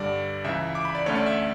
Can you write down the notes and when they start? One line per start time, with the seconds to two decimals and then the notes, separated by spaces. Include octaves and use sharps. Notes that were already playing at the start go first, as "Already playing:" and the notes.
Already playing: G2 D3 G3 D5
0.44 C#2 C#3 E3 E5
0.75 D6
0.85 B5
0.95 D5
1.06 D2 D3 A3 C#4 C#5
1.15 D5
1.26 E5